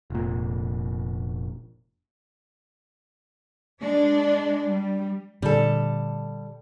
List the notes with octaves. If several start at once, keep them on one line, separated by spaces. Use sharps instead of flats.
F1 A#2
G#3 D4
G3
A#2 D3 G3 A4